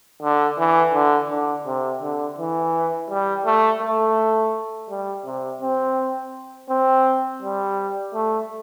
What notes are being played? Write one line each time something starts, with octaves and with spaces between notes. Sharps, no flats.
D3
E3
D3
D3
C3
D3
E3
G3
A3
A3
G3
C3
C4
C4
G3
A3